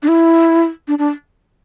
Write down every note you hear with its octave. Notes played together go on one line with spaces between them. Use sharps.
D4
E4
D4
D4